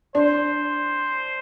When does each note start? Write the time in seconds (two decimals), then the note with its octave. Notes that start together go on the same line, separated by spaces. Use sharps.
0.15 D4 C5